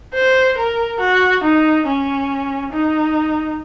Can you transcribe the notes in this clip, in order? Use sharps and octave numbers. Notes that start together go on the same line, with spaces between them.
C5
A#4
F#4
D#4
C#4
D#4